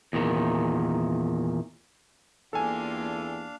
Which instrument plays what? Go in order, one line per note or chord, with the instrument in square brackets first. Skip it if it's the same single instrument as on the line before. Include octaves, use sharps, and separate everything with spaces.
[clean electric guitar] E2 A#2 D#3
[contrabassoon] E2 [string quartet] A#3 F4 G4 [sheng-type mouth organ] D4 F5 [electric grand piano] A4 G#5